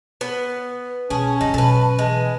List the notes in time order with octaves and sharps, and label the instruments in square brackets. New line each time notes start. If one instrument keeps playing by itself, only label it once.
[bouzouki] B3
[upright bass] B2 [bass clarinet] C#4 [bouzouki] G#4 [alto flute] A5
[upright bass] G1 [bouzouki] D#4
[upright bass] B2 F#3 [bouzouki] A4 B4
[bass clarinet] E3 [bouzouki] G#3